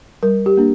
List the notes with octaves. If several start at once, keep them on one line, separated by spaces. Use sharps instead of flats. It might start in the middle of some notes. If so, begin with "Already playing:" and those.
G3 A#4
G4
A#3 D4